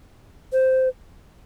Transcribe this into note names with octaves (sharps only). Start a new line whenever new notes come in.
C5